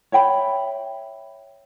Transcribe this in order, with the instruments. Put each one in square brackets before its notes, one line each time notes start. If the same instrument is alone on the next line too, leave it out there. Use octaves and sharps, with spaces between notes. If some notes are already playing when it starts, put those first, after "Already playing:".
[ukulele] C#5 E5 G5 B5